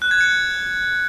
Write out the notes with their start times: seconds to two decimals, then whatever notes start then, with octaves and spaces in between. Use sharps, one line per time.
0.02 F#6
0.11 G#6
0.21 C#7